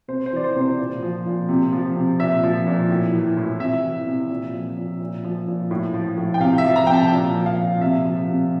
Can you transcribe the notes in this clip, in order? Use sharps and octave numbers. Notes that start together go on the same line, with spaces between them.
C3 C5
C5
E3 D5
C5
C3
C5
A#2
F3
A#2
C3
F3
C3
A#2 E5
F3
A#2
A2
E3
A2
C3 E5
E3
C3
A#2
F3
A#2
A#2
F3
A#2
A2
F3
A2
G5
C3 F5
E5
F3
A#5
C3 G5
A5
A#2
F3
F5
A#2
C3 E5
F3
C3